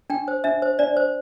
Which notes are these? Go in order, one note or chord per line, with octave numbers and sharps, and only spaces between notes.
D4 G5
C5
D4 E5
C5
D4 D5
C5